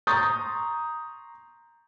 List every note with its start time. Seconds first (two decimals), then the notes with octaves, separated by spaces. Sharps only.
0.07 A#5 C6 C#6 D#6 G6 A6